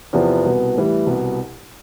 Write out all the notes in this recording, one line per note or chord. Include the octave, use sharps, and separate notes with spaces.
E2 C3 F3 B3
C2 B2 B3
A2 E3 G3
C2 B2 B3